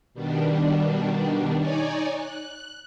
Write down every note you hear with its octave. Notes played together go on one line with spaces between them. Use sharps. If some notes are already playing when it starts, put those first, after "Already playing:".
B2 D#3 G3 D4
D#4 C#5 D5 G#5
F#6